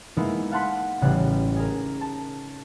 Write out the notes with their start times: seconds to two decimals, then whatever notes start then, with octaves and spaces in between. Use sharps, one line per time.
0.17 G#3 A#3 B3 D#4 E4
0.52 F5 F#5 A5 C6 F#6 B6
1.01 A1 C#3 G3 F#6
1.56 G#4 A#4
2.01 A5